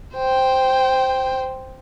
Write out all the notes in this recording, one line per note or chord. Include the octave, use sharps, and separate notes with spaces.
C5 G5